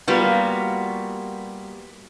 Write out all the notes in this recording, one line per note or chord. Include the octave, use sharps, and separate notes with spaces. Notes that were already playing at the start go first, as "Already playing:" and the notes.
G3 A#3 B3 F4 F#4